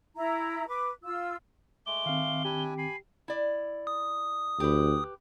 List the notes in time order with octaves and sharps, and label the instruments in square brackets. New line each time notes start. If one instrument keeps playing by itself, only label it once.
[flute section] E4 A#5
B4 D6
F4 E6
[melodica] G#3 A3 D6 [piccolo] G7
[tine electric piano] D#3 C4 [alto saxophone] F5
[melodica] D4 E4 G#5 [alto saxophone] G4
[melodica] G#5 B5 [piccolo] C7
[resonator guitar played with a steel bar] E4 D5
[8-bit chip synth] D#6
[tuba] D2 [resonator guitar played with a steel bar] G4 B4